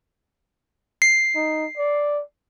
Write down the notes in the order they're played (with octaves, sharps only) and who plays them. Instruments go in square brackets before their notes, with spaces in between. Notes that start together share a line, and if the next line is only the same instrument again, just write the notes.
[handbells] C7
[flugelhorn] D#4
D5